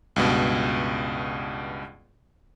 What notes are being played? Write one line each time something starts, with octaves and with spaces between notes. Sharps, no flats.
C#2 G2 B2